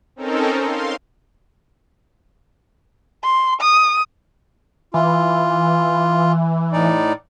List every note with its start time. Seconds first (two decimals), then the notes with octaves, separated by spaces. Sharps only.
0.16 C4 C#4 D#4 A4 A#4
0.63 F5 C6
3.24 C6
3.61 D#6
4.94 E3 F4
6.73 A2 D#4 D5